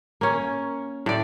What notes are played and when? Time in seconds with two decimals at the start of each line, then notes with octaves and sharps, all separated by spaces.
0.21 A#3 C#4
1.06 A2 D5